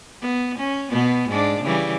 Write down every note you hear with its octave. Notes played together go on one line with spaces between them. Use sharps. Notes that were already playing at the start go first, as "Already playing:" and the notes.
B3
C#4
B2 B3
G#2 D4
C#3 E3 G3